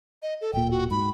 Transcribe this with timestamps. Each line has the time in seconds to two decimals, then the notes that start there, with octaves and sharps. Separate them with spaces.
0.22 D#5
0.41 A4
0.53 D1 A#2 G5
0.71 F#4
0.91 G#2 B5